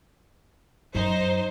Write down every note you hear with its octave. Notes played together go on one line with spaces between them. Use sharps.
F#2 D#4 C5